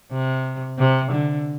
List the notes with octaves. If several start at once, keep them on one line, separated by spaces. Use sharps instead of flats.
C3
C3
D3